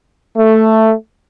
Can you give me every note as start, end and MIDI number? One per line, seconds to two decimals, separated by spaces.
0.36 0.92 57